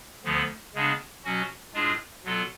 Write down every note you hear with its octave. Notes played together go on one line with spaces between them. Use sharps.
D2 D3 F3 B3
C#3 G#3 B3 D4
B2 F#3 C#4 F#4
A2 G#3 D4 F4 G#4
B2 F#3 B3 F4 A4